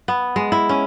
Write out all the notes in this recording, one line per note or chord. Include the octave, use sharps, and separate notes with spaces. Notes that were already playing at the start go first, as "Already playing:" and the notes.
B3
G#3
E4
C#4